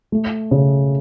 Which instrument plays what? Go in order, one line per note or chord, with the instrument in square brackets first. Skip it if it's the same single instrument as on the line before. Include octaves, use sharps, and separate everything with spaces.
[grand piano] A3
C#3